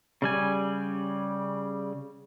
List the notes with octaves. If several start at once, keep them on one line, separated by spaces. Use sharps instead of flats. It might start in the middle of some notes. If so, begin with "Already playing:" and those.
C#3 G3 G#5